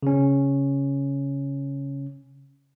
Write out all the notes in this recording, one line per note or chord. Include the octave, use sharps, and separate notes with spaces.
C#3 C#4